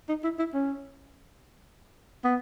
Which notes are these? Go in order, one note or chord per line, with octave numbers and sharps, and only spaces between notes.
D#4
E4
E4
C#4
B3